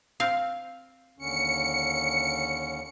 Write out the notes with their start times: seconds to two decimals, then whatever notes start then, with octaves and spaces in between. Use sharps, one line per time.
0.20 C4 F5
1.19 D#2 D3 C#4 C#7